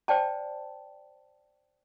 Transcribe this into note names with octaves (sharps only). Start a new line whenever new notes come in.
C5 D5 G5 A5